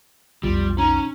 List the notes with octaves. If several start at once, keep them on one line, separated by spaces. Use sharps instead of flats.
B1 F2 G3 F4
C#4 D#4 A#5